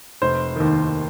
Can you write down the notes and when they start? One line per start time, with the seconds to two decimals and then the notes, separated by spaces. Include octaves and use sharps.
0.22 F1 C5
0.56 D#2 D#3